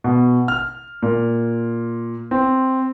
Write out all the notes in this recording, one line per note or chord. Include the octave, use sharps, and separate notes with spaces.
B2
F6
A#2
C4